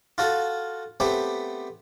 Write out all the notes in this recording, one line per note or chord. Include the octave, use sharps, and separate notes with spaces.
F4 F#4 A4
A3 B3 C4 G4